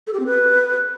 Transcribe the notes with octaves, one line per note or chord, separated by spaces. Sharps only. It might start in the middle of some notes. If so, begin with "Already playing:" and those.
A4
G4
C4
B4